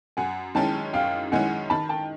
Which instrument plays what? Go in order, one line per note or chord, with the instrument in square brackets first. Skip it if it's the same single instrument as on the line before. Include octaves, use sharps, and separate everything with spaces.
[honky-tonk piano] F#2 [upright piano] F#5 G#5
[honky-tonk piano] D#3 G#3 C#4 E4 [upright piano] G5 A5
[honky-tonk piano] F#2 [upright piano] F5 G5
[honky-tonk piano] D#3 G#3 C#4 E4 [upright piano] F#5 G#5
[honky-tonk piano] D#3 [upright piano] A5 B5
[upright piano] G5 A5